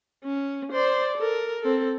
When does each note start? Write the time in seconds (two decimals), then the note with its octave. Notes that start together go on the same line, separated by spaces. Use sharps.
0.24 C#4
0.72 C5 D5
1.17 A4 A#4
1.61 C4 A4